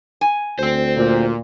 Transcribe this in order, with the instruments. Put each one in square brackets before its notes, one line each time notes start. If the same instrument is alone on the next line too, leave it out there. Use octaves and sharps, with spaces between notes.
[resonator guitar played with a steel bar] G#5
[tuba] D2 [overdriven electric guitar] C5 G5
[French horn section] A#2